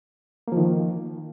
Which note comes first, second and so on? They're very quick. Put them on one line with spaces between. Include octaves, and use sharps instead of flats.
A#3 F3 D#3